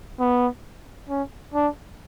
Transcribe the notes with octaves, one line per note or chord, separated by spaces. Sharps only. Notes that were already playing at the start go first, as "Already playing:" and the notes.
B3
C#4
D4